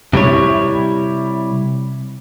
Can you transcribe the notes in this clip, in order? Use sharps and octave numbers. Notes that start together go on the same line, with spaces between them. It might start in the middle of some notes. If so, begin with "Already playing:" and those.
C3 G3 E4 C#5